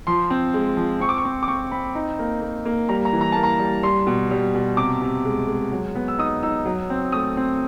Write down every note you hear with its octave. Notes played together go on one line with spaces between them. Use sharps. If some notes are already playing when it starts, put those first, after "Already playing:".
F3 C6
C4
G#3
F3
C4 C#6
D6
C#6
C4
D6
C4 C#6
C4 B5
D#4
A#3
A#3
A#3
G3 A#5
A#5
E3
A#5
A#3 A5
A#5
G3
G3 C6
B2
G3
B2
C3 D6
C3
G#3
G#3
F#3
B3
E6
D#4 D#6
D#4 E6
F#3
C4
A3 D#6
C4